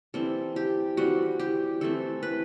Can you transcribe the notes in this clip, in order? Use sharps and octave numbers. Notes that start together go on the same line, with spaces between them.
E3 G3 C4 A4
G4
E3 G3 C4 F#4
G4
E3 A3 C4 A4
B4